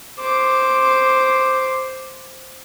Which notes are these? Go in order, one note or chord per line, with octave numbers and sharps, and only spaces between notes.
C5 D6